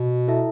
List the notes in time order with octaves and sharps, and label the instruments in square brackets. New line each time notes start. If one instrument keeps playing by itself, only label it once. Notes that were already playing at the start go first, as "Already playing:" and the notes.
Already playing: [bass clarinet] B2
[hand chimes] E4 A4 E5 A5